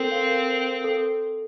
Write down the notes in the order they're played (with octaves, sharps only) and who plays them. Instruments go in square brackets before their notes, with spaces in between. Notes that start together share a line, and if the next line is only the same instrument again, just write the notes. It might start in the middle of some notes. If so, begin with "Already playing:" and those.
Already playing: [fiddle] C4 [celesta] A4 A#4
[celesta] F5
A#4
A4